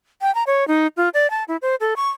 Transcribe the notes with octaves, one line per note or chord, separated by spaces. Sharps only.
G5
A#5
C#5
D#4
F4
D5
A5
E4
C5
A4
C#6